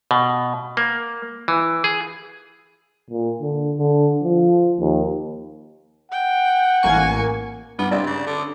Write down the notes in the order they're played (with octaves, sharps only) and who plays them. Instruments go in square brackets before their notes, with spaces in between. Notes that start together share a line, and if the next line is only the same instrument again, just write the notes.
[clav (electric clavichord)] B2
A#3
E3
G#4
[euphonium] A#2
D3
D3
F3
D#2
[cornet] F#5 [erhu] G5
[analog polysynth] A1 A#3 C#6 [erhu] G#5
[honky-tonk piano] G2 [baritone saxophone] B3
[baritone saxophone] C3 [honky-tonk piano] D5
[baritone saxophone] C#3
D3